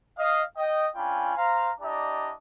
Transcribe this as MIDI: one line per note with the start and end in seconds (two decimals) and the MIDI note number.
0.18 0.42 75
0.18 0.42 77
0.57 0.87 75
0.57 0.87 79
0.96 1.32 61
0.96 1.32 62
0.96 1.32 65
0.96 1.32 79
0.96 1.32 80
0.96 1.32 83
1.36 1.70 72
1.36 1.70 77
1.36 1.70 82
1.81 2.32 62
1.81 2.32 64
1.81 2.32 67
1.81 2.32 74
1.81 2.32 75
1.81 2.32 82